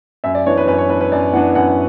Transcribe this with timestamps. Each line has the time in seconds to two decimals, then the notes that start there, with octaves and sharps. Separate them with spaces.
0.24 F#2 E5
0.35 D5
0.46 E3 B3 D4 C#5
0.57 B4
0.67 F#2 B4
0.78 C#5
0.89 E3 B3 D4 B4
1.01 B4
1.12 F#2 D5
1.33 E3 B3 D4 F#5
1.55 F#2 F#5